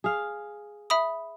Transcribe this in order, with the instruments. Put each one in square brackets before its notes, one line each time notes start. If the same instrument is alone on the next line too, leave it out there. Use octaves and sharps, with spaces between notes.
[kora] G#4 F5
[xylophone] E5 B5 D#6